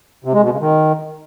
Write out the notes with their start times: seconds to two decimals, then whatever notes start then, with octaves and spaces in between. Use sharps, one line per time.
0.25 C3
0.34 G#3
0.43 B2
0.52 C#3
0.61 D#3